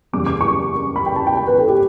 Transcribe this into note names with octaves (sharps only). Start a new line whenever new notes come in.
F#1 E2 C#3 G3 D6
D6
C#6
B5
G5
A5
G5
G5
B4
A4
G4